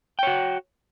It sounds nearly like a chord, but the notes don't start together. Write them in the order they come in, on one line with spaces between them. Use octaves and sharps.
G5 C#5 F#4